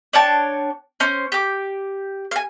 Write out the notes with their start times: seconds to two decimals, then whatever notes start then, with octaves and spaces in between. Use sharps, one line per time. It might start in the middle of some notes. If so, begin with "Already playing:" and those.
0.13 D4 C#5 G5 A5
1.00 C#4 C5
1.32 G4 D6
2.31 F5 G#5